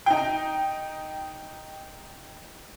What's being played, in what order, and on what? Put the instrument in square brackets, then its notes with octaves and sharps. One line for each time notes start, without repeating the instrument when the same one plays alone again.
[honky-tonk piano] D#4 G5